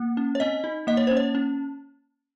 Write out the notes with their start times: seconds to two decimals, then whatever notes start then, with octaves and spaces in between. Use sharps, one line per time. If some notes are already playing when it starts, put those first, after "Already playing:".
Already playing: A#3
0.17 C#4
0.35 C#5
0.40 C4 D#5
0.64 D#4
0.87 A#3 D#5
0.97 C#5
1.07 C#4 C5
1.17 C#5
1.35 C#4